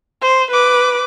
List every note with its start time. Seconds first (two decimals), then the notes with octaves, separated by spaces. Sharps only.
0.21 C5
0.51 B4 D6